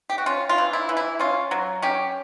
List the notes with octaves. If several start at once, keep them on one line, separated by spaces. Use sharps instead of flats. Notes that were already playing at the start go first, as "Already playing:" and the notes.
G4
F#4
C#4 F4
F4
E3
E4
E3
E4
C#4 F4
F#3
C#4 G4